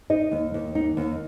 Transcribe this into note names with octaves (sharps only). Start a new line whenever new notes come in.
D#4 D#5
D#2
D#2
D#4
D#2